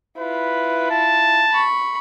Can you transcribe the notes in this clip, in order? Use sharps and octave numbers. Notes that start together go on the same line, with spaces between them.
E4 F4 B4
A5
B5 C#6